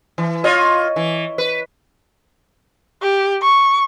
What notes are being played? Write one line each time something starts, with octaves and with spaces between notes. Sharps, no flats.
E3
F4 C#5 D#5
E3
B4
G4
C#6